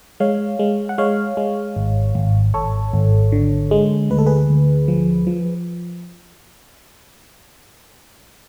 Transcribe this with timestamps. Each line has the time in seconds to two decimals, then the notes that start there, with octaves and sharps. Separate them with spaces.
0.20 G#3 C#5 F5
0.59 G#3
0.89 F#5
0.98 G#3 C#5 F5
1.37 G#3
1.76 G#1
2.15 G#1
2.54 G#1 A4 C#5
2.94 G#1
3.32 D3
3.71 G#3
4.10 D2 B4
4.18 A4
4.26 G#4 B4
4.49 D2
4.88 F3
5.27 F3